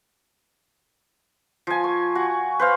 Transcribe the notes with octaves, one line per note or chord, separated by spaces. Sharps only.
F3 G#5
C#6
F#4
B4 C5 F5